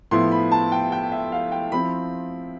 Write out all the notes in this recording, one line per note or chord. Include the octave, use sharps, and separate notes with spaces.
A2 F3 B3 E4 C6
B5
A5
G5
G5
E5
F5
G5
F3 C4 E4 B5